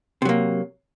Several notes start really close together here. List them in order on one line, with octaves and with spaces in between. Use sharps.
C3 F#3 A#3